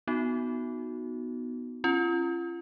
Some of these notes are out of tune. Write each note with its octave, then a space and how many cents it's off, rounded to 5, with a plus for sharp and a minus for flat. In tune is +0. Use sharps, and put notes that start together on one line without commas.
B3 +0 D#4 +0 F#4 -10
C#4 -30 F4 -35